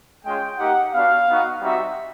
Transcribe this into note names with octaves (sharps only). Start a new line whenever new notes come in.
G#3 C#4 F4 G5
A#3 D#4 G4 F#5
B3 D4 F#4 F5
B3 D#4 F#4
G3 C4 D#4 F#4 E5